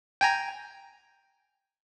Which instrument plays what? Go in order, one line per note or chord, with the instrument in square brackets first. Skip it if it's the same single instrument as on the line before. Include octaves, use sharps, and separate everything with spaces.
[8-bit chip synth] G5 G#5 A#5